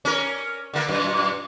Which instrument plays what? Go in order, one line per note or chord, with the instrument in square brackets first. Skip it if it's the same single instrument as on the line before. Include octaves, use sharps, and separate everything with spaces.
[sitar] C#4 A#4
D3 A#3
F#2 A#2